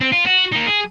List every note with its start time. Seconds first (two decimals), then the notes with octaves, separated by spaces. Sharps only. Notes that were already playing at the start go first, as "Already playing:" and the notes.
0.01 C4
0.13 F4
0.27 F#4
0.53 A#3 D#4
0.67 G#4